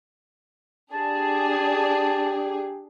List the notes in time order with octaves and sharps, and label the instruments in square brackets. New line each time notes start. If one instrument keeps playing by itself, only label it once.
[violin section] D4 G#4 [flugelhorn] G4 [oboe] A5